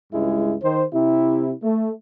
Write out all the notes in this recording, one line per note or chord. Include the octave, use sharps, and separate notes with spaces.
C#2 G2 G#3 E4
D#3 C5
C3 E4
A3